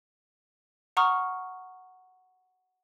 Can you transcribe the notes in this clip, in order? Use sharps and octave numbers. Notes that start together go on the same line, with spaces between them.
F#5 A#5 C#6 D#6 F6